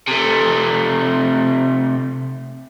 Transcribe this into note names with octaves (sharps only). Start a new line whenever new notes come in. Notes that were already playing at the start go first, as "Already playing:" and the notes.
C3 A3